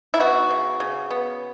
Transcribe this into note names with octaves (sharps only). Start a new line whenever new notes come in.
E4
B3 F#4
C#3
C#3
B3